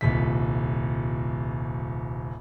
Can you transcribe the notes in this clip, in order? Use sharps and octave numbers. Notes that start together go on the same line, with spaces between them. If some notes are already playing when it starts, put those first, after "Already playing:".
D#1 C2 B6